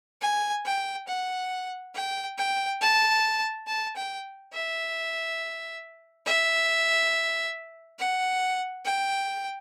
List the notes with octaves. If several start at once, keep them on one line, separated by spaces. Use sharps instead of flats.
G#5
G5
F#5
G5
G5
A5
A5
G5
E5
E5
F#5
G5